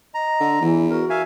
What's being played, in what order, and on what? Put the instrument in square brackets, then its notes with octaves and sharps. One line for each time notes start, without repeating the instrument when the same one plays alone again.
[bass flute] D#5 [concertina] A#5
[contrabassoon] D3
[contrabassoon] E2 [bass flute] E3
[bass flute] F#4 [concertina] A#4
[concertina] E5 F5 G#5